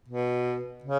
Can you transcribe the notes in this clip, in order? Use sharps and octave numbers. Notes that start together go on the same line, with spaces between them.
B2
C#3